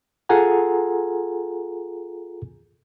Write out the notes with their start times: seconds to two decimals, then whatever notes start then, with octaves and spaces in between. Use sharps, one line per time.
0.29 F4 G#4 A4 F#5 G#5 A#5